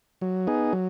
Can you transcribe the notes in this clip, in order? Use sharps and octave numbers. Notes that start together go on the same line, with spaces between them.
F#3
B3 D#4 G#4
F#3